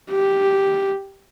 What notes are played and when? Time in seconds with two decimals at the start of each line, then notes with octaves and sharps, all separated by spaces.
0.11 G4